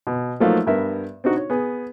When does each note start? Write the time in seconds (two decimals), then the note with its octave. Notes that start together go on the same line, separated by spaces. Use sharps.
0.07 B2
0.40 F3 F#3 A3 A#3 D#4 F5
0.67 G2 B3 A#4 E5
1.24 C4 D4 D#4 F#4
1.37 C#5
1.50 B3 G#4